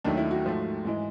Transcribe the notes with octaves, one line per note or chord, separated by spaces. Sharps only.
D#2 D#3 F#3 A3 D4
E4
F#4
G#2 F3 A3
G#2 E3 G#3